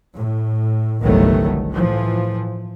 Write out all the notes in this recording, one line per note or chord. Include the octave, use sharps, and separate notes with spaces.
A2
G1 C2 D#3 F#3 A3 B3
A2 E3 F3